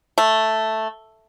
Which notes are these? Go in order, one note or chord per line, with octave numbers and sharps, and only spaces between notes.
A3